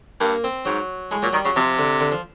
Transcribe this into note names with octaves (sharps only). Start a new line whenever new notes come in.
G2 A#3
C4
G#2 F#3
A2 G#3
A#2 F#3
D#3 G3
C#3 F#3
C3 F3
D3
D3
F3